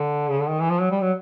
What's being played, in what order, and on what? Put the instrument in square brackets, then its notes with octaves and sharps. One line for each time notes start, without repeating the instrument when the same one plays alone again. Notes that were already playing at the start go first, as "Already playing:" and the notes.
Already playing: [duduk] D3
C#3
D3
D#3
E3
F3
F#3
G3
F#3